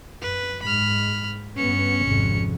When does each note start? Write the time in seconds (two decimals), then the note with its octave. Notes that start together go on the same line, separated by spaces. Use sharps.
0.22 F#2 B4
0.62 G#2 B5 F6
1.56 G2 B3 C#4 C#7
2.02 G#1 F2 C3